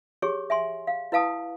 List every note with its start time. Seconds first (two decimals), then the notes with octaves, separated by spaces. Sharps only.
0.22 G4 G#4 C#5 C#6
0.50 E5 G#5 C6
0.87 F5
1.12 E4 B4 F5 A5 D#6